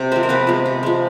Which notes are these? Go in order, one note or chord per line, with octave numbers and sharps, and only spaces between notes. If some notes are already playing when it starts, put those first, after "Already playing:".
Already playing: C3
F3 G#3 C4 C5
A#4
C3 B3 B4
F3 G#3
C3
F3 G#3